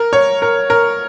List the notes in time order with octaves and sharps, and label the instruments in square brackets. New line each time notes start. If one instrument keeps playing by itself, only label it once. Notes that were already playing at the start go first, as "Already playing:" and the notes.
Already playing: [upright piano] A#4
C#5
A#4
A#4